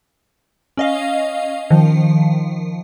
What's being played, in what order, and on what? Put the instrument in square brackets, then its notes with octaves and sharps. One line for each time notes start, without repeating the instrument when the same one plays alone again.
[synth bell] C#4 D#5 F5
D#3 F3